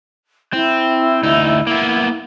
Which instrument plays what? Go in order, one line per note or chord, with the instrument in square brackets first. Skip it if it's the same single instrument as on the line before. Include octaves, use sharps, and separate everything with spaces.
[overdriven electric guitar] C4 [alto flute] E4
[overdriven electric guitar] D2 D#4
A#3 B3